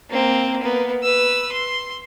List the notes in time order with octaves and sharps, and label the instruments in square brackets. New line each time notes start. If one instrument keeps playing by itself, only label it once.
[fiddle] A#3 C4
A#3 B3
B4 E6
C6